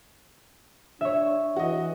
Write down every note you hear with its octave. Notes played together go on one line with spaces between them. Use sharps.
D4 C#5 E5
E3 F#4 D#5